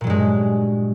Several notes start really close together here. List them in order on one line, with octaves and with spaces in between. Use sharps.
A#2 F#3 G2 G#3